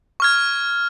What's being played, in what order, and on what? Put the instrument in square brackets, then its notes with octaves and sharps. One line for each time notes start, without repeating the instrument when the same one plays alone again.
[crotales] C#6 F6 G#6